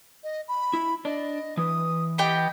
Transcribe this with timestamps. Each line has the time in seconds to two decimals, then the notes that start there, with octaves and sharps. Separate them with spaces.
0.24 D#5
0.48 B5
0.73 E4
1.05 D4 D5 D#5
1.57 E3 B4 D#6
2.18 B3 G4 D#5 G5